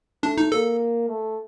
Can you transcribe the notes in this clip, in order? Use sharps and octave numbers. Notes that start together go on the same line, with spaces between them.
A3 D4
D#4
A#3 A4
A3